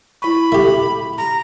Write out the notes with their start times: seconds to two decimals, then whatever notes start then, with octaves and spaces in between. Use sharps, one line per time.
0.22 E4 B5 C#6
0.52 A3 G4
1.18 A#5